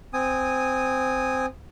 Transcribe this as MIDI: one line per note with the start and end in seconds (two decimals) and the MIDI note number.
0.13 1.46 60
0.13 1.46 80
0.13 1.46 87